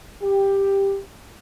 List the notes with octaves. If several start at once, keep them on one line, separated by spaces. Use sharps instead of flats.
G4